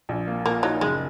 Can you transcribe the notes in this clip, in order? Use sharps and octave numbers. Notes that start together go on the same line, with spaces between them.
A#1
A#3
A#2 A#3
F#3 D#4
F#1 G#3